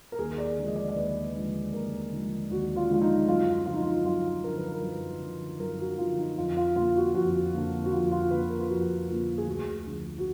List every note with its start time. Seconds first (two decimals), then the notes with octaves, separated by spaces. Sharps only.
0.12 A#4
0.18 D#2 G#4
0.38 D5
0.57 D3 F3 G#3
0.67 D#5
0.76 D5
0.89 D5
0.96 D#2 B4
1.35 D3 F3 G#3
1.73 D#2 A#4
2.12 D3 F3 G#3
2.50 D#2 F#4
2.76 F4
2.89 D3 F3 G#3 F4
3.01 D#4
3.28 F#2 F4
3.66 D3 F3 F4
3.74 D#4
3.82 F4
4.05 F#2 F4
4.44 D3 F3 A#4
4.58 B4
4.72 A#4
4.82 F#2
5.21 D3 F3
5.60 F#2 A#4
5.79 F#4
5.98 D3 F3 F4
6.18 D#4
6.37 F2 F4
6.57 F4
6.76 D3 F3 A#3 F4
6.96 F#4
7.14 F2 F#4
7.53 D3 F3 A#3
7.84 F#4
7.91 F2 F4
8.11 F4
8.31 D3 F3 A#3 B4
8.50 A#4
8.60 F4
8.69 F2 F#4
9.07 D3 F3 A#3 F4
9.38 G#4
9.46 D2 F#4
9.86 D3 F3
10.18 F#4